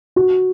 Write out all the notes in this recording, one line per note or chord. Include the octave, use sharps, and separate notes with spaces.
F#4